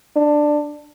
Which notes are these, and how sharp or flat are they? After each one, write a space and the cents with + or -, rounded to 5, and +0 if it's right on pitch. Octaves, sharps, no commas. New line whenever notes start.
D4 +10